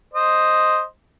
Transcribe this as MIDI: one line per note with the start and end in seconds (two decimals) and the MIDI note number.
0.14 0.82 72
0.14 0.82 75